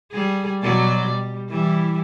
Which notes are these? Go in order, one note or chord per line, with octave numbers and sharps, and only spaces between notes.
G3 G#4
B2 F#3 D5
G3
E3 G3 E4